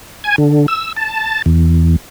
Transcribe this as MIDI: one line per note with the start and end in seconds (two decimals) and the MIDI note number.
0.24 0.36 80
0.38 0.66 50
0.68 0.92 88
0.96 1.42 81
1.46 1.96 40